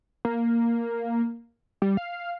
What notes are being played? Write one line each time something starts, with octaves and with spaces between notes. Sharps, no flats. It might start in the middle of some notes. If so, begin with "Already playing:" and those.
A#3
G3
F5